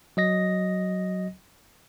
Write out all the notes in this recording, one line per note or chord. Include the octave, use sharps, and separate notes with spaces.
F#3 D#5 A#6